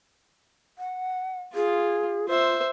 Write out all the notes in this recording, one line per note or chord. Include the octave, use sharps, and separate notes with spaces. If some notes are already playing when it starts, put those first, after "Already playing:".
F#5
F4 G#4
F4 C5 E5